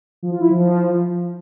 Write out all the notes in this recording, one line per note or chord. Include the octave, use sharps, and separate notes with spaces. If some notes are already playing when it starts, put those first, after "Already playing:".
F3
F4
E4
F3